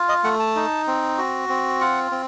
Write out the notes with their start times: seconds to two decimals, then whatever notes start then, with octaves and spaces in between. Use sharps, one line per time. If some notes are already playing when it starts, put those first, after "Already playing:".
Already playing: F4
0.09 D#5
0.24 A3 F#5
0.39 A5
0.56 D#4
0.87 C4
1.18 F#4
1.49 C4
1.81 F4 F#5
2.11 C4